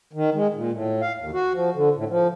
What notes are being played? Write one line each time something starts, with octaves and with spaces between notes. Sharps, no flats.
D#3
G#3
A#2
A2
F5
D#2
F#4
F3
D3
A2
F3